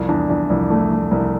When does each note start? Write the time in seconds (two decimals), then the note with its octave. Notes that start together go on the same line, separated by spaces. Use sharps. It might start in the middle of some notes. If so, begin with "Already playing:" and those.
Already playing: C2 F2
0.08 E2 D4
0.30 E2 D4
0.50 C2 F2
0.70 A3
0.91 A3
1.11 C2